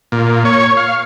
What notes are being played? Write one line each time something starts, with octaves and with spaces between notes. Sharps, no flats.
A#2
C#5
F5